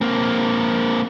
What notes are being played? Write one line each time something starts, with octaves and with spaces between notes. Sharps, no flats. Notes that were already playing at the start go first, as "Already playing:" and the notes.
A#3 C4